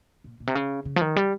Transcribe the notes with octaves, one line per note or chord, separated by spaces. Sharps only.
A#2
A#2
C3
C#3
C#3
F3
D#3
G3